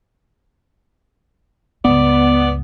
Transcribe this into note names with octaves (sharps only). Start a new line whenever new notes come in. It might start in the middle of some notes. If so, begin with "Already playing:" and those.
C#2 G2 B3 D5